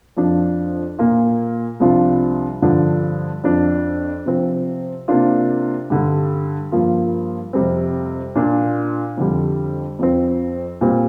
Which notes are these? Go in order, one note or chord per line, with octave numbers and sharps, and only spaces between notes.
F2 F3 D4 F4
A#2 A#3 F4
C2 C3 F3 D4 F4
G2 D3 F3 D4
F2 F3 D4
C3 F3 C4
C3 A#3 D4 F4
G2 D3 G3
G2 F3 A#3 F4
F2 C3 G3 C4
A#2 A#3 D4 F4
F2 D3 G3
F2 F3 C4
A#2 G3 C4